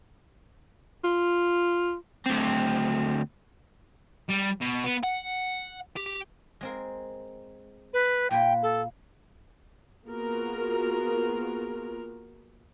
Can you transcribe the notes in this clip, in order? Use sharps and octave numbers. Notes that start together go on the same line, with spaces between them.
F4
D2 C4
G3
B2
B3
F#5
G4
G#3 C4 A#4
B4
A#2 A#3 B4 G5
A4
A#3 B3 F4 F#4 G#4 A#4